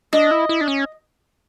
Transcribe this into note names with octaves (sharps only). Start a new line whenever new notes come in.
D4 D#5
E4
E4
D4
C#4